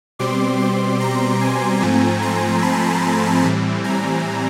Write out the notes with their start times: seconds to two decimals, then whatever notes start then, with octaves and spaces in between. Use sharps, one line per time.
0.19 B2 G3 C4 C6 D6
0.60 C6 D6
1.00 A#5 C6
1.40 G#5 A#5
1.81 G#2 F3 A3 C4
2.22 A#5 C6
2.62 A5 B5
3.43 A2 E3 G3 C4
3.84 G#5 A#5